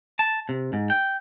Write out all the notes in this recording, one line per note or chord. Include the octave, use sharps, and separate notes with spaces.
A5
C3
G#2
G5